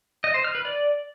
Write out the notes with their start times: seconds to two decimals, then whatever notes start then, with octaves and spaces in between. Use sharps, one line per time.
0.24 D#5
0.34 C5
0.44 F6
0.55 B4
0.65 D5